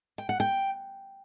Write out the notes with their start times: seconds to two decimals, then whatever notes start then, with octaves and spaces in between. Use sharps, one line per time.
0.18 G5
0.29 F#5
0.40 G5